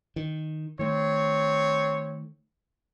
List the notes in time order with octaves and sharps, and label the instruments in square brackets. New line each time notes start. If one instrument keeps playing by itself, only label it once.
[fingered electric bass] D#3
[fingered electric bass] D#3 A3 [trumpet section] C4 C#5